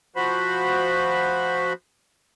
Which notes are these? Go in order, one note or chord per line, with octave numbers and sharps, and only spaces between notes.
F3 F#4 C5 B5